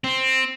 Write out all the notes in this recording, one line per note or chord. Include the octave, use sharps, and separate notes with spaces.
C4